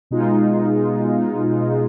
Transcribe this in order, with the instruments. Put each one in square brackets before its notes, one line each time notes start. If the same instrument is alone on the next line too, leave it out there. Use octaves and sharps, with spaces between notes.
[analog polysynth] B2 G#3 D#4 F4